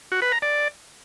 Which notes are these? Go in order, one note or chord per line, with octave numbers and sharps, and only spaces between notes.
F#4
B4
A#5
D5